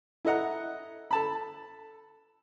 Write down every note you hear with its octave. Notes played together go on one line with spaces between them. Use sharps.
E4 A4 D#5 F#5 A#5
A4 A5 B5